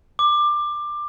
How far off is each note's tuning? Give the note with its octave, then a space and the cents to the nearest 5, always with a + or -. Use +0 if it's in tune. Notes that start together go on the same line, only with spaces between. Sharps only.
D6 +20